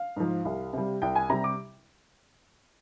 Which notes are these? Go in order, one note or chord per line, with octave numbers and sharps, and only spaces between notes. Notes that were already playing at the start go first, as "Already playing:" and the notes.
Already playing: F5
G#2 F3
C2
C3 G3
C2 G5
G#5
C3 G3 A#5
D6